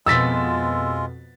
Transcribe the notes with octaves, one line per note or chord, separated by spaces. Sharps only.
F2 B2 G#3 F4 E6 A6 B6